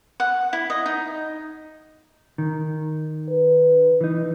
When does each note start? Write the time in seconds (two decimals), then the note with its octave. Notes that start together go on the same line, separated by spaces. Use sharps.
0.20 F#5
0.53 E4
0.70 D#5
0.86 D#4
2.38 D#3
3.30 B4
4.01 E3 D#4